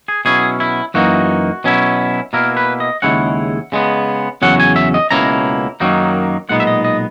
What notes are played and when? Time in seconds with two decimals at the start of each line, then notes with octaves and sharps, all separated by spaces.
0.08 G#4
0.25 B2 F#3 C#4 E4 G#4
0.60 E4
0.94 F#2 E3 A#3 D#4 F#4
1.64 B2 F#3 C#4 E4
2.33 B2 A#3 E4 A#4
2.57 B4
2.80 D#5
3.02 D#2 C#3 G#3 C#4 E4 F#5
3.72 C#3 G#3 B3
4.42 E2 C#3 F#3 C#4 F#5
4.60 G#5
4.76 E5
4.94 D#5
5.11 C#2 B2 A#3 C#4 E4 A#5
5.80 F#2 D#3 F#3 A#3 D#4
6.49 B1 A#2 G#3 B3 D#4 F#5
6.60 E5
6.67 D#5
6.85 D#5